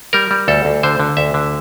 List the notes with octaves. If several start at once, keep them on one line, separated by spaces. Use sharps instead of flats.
G3 A#4
G3
D2 A4
D2
D3 C5
D3
D2 E5
D3